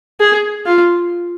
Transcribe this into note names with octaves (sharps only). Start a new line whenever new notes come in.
G#4
F4